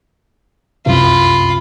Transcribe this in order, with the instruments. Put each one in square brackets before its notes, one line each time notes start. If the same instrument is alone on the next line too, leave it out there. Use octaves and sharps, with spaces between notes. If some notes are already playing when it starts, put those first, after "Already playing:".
[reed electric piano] C2 F#2 C3 [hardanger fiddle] F4 B5